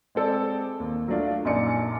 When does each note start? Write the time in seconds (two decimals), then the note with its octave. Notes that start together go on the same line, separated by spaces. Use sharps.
0.15 G#3 C4 A4 D5
0.80 D#2
1.08 F#3 A3 D4 F4
1.45 A#1 F#2 D#4 D5 C6 C#7